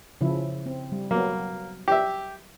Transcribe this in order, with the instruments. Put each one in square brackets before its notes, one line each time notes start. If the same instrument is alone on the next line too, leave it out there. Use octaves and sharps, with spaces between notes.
[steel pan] C#3 F3 E4
C4
G3
[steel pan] F#3 B3 [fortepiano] A#3
[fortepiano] G4 E5